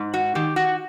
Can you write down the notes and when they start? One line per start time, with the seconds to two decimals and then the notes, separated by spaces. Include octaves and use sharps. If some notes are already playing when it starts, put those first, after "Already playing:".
Already playing: G#2
0.14 F#4
0.35 D#3 G4
0.56 F#4